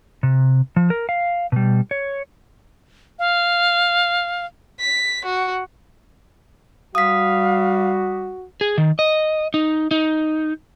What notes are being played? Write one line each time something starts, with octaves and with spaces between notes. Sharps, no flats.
C3
F3
A#4
F5
B2 G3
C#5
F5
B6
F#4
G3 F#4 F5 D#6 B6
G#4
D#3
D#5
D#4
D#4